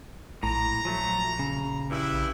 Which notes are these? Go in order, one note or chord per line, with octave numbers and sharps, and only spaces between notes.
A#1 A2 A#5
F3 F#3 A3
C#3
G2 E4